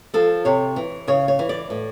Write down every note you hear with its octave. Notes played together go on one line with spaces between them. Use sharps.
F3 A4
C3 C#5
E3
C#3 C#5
C#5
E3
D5
A2